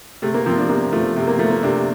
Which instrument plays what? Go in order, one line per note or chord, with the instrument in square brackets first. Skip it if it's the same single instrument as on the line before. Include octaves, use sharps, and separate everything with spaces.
[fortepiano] C3 A3
A#3
F3 C4
D4
C3 A#3
F3 A3
C3
A#3
F3 A3
A#3
C3 D4